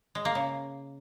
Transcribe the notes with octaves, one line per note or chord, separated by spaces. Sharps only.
G#3
A#3
C#3